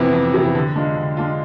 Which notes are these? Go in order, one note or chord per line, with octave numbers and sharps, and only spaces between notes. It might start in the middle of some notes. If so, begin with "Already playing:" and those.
Already playing: F2 C3 E3 B3
F2
C3 E3 B3
D3
G#3 D4 F4
D3
G#3 D4 F4